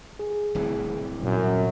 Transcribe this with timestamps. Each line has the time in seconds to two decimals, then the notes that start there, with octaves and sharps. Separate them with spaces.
0.19 G#4
0.55 D1 C2 E3
1.23 F#2 A#2